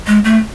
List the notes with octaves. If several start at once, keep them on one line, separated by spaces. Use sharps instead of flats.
G#3
A3